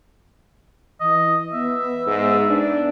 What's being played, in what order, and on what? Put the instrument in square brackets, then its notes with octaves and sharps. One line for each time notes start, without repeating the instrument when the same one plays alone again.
[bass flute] E3 [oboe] D#5
[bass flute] B3 [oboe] E5
[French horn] G#2
D4